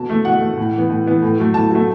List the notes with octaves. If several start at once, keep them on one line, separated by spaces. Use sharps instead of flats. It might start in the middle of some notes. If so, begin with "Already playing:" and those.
Already playing: B2 A5
A3
B2 F#5
A3
A2
E3 B3
A2
E3 B3
A2
F#3 A3
A2 A5
F#3 A3